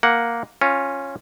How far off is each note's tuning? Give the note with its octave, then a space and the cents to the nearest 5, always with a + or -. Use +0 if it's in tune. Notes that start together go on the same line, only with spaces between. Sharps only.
A#3 +0 F#5 +0
C#4 -10 F4 +5